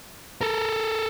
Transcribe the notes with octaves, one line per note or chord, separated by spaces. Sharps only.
A4 A#4